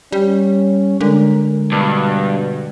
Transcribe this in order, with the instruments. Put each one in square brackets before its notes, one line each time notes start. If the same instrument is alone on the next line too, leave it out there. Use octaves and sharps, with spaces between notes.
[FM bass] G3 [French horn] C#4
[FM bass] D3 [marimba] G#3 [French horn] A#4
[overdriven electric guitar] G2 [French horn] B2